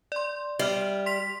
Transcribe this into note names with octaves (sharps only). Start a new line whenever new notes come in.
D5 C6
G3 E5 F6
C6 B6 F7